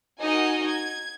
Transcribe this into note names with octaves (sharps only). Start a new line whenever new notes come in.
D#4 F#4 A#4 D#5 G#5
G#6